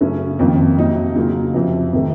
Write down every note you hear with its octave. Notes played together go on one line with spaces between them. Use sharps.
F#2 C#3 A3 C#4
F2 D#3 A#3
F2 C3 F#3 A#3 D#4
C#3 F#3 A#3 F4
F2 C3 F3
C3 D#3 A3